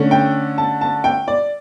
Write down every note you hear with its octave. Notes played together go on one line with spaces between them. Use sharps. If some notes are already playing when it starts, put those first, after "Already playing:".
Already playing: D3 A3 C#4
G5
A5
A5
G5
D5